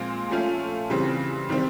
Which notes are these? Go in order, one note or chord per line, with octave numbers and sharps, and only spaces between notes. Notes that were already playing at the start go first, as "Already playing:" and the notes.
Already playing: A#2 F3 G#3 C4
F3 A3 C#4 F4
C#3 E3 G3 C4
C3 D#3 G3 C4